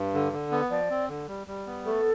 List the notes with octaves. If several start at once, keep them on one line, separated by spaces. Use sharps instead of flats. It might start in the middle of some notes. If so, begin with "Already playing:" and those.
Already playing: G2
D3
D3
B3
F3 D5
C4
D3
G3
G3
B3
A3 A4